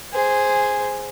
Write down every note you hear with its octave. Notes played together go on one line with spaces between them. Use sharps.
G#4 C5